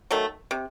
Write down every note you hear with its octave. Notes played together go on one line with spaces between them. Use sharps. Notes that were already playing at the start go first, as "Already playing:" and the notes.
D#3 F#3 A3
C3